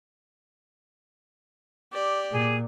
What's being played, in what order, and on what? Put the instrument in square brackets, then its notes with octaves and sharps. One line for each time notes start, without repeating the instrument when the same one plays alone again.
[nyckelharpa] G4 D5
[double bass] A#2 [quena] G#4